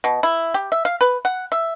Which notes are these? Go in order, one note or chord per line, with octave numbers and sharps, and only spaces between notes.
B2
E4
G4
E5
F5
B4
F#5
E5